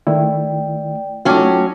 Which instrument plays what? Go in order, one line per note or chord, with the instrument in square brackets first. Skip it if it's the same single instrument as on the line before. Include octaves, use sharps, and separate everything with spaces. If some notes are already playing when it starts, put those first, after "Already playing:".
[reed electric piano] D#3 A3 E4 [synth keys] D5 G5
[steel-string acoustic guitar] F#3 C#4 [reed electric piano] A3 D#4 F4 [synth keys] G5 A5 D6